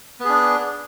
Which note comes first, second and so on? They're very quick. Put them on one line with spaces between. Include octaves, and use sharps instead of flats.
B3 G#4 D4